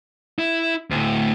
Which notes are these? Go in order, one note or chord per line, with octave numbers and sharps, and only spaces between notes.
E4
D2 A2